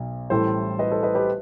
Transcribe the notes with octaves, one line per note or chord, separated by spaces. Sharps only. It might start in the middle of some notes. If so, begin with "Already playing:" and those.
Already playing: B1 B2 F#3
A1 A2 E3 G3 A4 C5
B4 D#5
A4 C5
B4 D#5
G4 B4